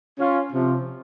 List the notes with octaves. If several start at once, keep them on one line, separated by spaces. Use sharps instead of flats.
C#4 F4
C3 F3